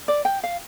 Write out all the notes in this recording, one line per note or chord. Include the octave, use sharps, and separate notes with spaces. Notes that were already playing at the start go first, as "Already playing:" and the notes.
D5
G5
F5